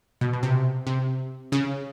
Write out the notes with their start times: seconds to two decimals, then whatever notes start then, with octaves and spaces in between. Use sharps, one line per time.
0.21 B2
0.33 B2
0.43 C3
0.87 C3
1.52 C#3